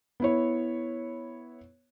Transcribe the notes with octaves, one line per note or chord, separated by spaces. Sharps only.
B3 E4 C#5